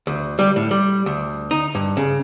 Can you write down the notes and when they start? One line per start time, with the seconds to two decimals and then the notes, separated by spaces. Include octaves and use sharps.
0.07 D2
0.39 G3
0.56 A2
0.71 G3
1.06 D2
1.51 D#4
1.75 G2
1.97 C#3